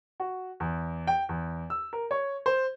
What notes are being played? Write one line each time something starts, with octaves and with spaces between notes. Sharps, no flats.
F#4
E2
G5
E2
E6
A#4
C#5
C5